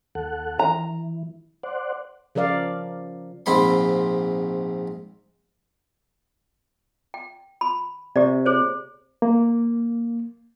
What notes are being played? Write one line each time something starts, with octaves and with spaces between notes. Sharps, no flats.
D#2 A4 F#5
E3 A#5
C5 D5 F#5
C#3 F3 A#4 D5 F5
A#1 G#2 C4 B5 C6
G5
B5
C3 G4 D5
G#4 C5 C#5
A#3